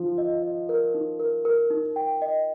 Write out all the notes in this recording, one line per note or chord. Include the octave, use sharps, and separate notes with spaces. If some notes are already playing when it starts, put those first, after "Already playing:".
Already playing: F3 D#4
D#5
D#5
A#4
D#4
A#4
A#4
D#4
G5
D#5